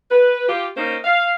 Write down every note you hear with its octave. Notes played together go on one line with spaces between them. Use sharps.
B4
F4 G4
A#3 C#4 D#4 A#4 C5
F5